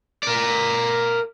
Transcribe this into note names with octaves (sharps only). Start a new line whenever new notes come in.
A#4 D5